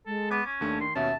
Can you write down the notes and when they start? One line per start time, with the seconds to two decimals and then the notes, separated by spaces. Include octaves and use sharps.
0.07 G#3 A4
0.31 B3 D6 G#6
0.46 C#4
0.61 D#2 A3 D4
0.81 D#3 C6
0.96 D#2 B2 C#4 E5 A5